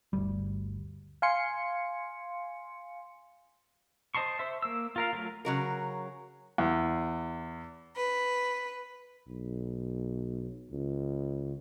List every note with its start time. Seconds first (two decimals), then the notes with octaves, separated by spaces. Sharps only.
0.13 G1 D2 G3
1.22 F5 G#5 C6 C#7
4.15 C5 D#5 A5 C6 C#6
4.39 C5 E5
4.62 A#3 E6
4.96 F4 A#4 F5
5.13 F#3 A3 F4
5.45 C#3 F#3 A#4
6.58 E2
7.96 B4
9.27 B1
10.71 C#2